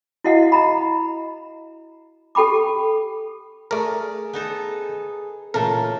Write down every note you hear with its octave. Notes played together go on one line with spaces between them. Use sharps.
E4 F#4 D#5 F5 F#5
D#5 A#5 B5
G4 A4 G5 B5 D6
A3 G#4 A#4 D5
B3 D#4 A4
A#2 C#3 E3 A3 A4 A#4